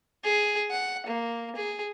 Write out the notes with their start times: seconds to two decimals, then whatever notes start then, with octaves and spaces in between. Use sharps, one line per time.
0.24 G#4
0.71 F#5
1.07 A#3
1.56 G#4